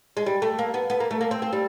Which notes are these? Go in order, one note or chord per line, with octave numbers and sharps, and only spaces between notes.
G#3
G3
A3
A#3
B3
B3
A#3
A3
A#3
C4
C4
G3